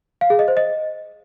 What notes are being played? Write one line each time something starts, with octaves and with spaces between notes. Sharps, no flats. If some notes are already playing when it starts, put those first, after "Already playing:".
F5
G#4
D#5
C5
D#5